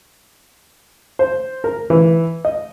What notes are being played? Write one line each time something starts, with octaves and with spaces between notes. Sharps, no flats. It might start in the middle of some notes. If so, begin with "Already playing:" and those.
C5
A#4
E3
D#5